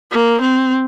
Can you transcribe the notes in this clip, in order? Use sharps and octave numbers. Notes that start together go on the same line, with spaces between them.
A#3
C4